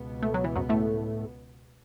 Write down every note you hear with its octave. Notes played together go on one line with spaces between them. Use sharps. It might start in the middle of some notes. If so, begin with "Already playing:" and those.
Already playing: C#2 B2 B3
A3
F#3
E3
F#2 F#3
A2 A3